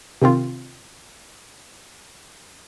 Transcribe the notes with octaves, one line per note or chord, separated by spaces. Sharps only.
C3 D#3 C4 F4